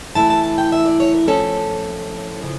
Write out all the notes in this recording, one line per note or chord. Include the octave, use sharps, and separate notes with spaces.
E3 A3 E4 A5
A5
A5
G5
E5
D5
C#5
A#4
A2 F3 C#4 A4
C#3 F3